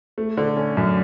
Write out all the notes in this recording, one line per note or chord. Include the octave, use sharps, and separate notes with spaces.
A3
D3
C#4
F#2